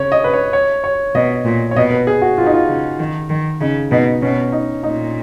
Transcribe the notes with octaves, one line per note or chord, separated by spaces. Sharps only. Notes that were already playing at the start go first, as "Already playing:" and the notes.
Already playing: C#3 C#5
D#5
B4
C#5
C#5
C#5
B2 D#5
A#2
C#5
B2 D#5
B4
G#4
F#4
B2 F4
D#4
F4
C#3
D#3
D#3
C#3 D#4
B2 D#4
B2 C#4
D#4
A#2 D#4